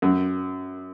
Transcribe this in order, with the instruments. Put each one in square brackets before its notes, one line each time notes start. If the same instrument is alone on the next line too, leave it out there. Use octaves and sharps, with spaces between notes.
[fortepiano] F#2